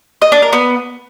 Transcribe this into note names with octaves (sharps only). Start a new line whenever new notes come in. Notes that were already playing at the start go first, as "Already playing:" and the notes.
D#5
D4
A#4
B3